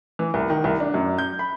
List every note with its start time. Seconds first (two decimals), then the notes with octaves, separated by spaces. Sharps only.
0.19 E3
0.34 C2
0.50 D#3
0.64 C2
0.80 D4
0.94 F#2
1.18 G6
1.39 B5